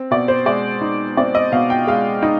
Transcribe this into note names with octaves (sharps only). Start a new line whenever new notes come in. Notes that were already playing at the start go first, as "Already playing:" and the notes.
Already playing: C4
B2 D5
C5
G#3 D5
D#4
C4 D5
D#5
B2 F5
G5
G#3 F5
D#4